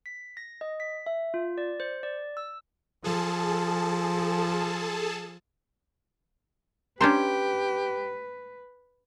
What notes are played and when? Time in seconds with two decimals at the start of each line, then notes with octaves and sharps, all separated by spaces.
0.06 B6
0.37 A#6
0.61 D#5
0.80 B6
1.06 E5
1.34 F4
1.58 D5
1.80 C5
2.03 D5
2.37 E6
3.04 F3 G#4 A4 A5
7.01 C#4 D4 G4 B4 C5 A#5 C6 G6